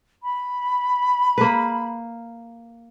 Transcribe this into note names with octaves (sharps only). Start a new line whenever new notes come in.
B5
A#3 B4